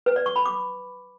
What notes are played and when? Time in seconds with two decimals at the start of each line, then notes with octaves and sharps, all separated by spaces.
0.06 B4
0.16 D5
0.26 C#6
0.36 B5
0.46 D6